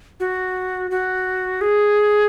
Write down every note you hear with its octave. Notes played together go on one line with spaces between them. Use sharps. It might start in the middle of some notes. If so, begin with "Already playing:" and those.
F#4
F#4
G#4